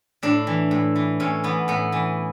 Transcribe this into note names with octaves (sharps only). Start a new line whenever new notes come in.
A2 D4
E3
A2
E3
A2 C#4
E3 B3
A2 B3
E3